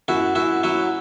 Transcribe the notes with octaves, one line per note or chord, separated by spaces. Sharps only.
F#2 E4 F#4
F#2 E4 F#4
F#3 E4 F#4